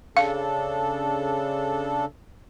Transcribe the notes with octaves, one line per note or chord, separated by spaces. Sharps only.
C#3 D4 A4 F5